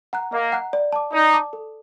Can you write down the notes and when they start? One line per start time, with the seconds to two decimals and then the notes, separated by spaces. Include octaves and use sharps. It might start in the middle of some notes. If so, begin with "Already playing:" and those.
0.13 F#5 A#5 F#6
0.32 A#3 D#5
0.52 F#5 A#5 F#6
0.73 D5
0.93 A5 D6
1.13 D#4 D5
1.33 A5 D6
1.53 A4